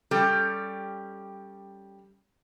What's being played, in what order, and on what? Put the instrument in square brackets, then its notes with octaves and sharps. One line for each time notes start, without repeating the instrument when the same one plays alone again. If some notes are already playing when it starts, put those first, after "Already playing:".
[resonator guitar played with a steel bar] G3 C#4 G4 A4